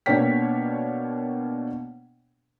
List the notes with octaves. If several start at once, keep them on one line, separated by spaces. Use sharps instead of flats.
B2 A#3 D4 C#5 G5 B6